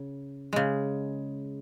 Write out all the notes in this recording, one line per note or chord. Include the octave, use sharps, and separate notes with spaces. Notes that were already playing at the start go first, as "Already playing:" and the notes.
Already playing: C#3
C#3 G#3